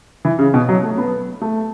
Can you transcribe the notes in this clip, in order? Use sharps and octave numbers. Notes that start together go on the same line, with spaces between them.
E3
C#3
B2
F#3
A3
B3
A3